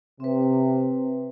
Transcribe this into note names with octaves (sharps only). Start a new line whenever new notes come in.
C3 C4 B4